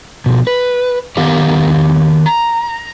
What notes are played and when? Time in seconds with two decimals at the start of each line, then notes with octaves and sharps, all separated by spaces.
0.26 B2 F3
0.47 B4
1.17 D#3 B3 G4 F5 F#5
2.26 A#5